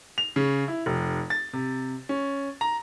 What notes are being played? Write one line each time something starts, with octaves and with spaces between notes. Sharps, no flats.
F7
C#3
E4
F1
A6
C3
C#4
A#5